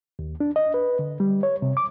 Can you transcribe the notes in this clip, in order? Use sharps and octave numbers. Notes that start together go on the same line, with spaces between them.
D#2
D4
D#5
B4
D3
G3
C#5
C3
D6